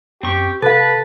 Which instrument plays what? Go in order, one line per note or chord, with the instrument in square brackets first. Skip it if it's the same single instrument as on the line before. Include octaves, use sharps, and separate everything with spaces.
[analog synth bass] F#2 [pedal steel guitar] C4 C#6 [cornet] G4
[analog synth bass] C3 [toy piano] A4 F5 [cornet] B4 [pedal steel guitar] A5